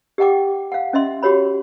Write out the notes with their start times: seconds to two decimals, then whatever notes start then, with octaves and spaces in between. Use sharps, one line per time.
0.18 G4 D#5 F#5 G5 D6
0.72 F5 F#5
0.93 C#4 D#5 E5 C6
1.23 F#4 G4 C#5 B5